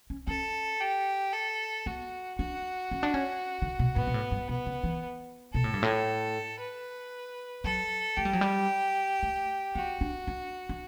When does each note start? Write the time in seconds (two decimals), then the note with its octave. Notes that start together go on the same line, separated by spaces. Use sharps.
0.10 C#4
0.27 C#4 A4
0.80 G4
1.33 A4
1.86 B3 F#4
2.38 D4 F#4
2.91 C#4
3.03 D4
3.14 C#4
3.62 D3
3.79 B2
3.96 A2 B3
4.07 B2
4.14 A2
4.31 G2
4.49 B2 B3
4.66 C#3
4.84 E3
5.54 B2 A4
5.64 A2
5.74 G2
5.83 A2
6.60 B4
7.64 F#3 A4
8.17 A3 G4
8.25 G3
8.33 F#3
8.41 G3
9.23 A3
9.75 B3 F#4
10.01 D4
10.27 D4
10.69 D4